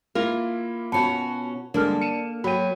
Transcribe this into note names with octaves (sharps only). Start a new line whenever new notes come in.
A#3 E4 F4 A#4
B2 C#4 F#4 F#5 A5 B5 C#7
D3 G3 G#3 A#3 D4 A4 A#4 F6
C#7 D#7 E7
F#3 F#4 G5 B5 D#7